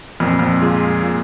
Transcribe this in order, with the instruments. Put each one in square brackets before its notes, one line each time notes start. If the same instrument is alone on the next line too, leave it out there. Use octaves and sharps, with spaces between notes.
[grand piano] F2 [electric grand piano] A#2
[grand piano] F2
[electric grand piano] G#3 F4 G#4
A#2